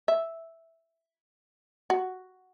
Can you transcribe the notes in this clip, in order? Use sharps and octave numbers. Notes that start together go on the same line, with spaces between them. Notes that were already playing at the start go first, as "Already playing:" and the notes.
E5
F#4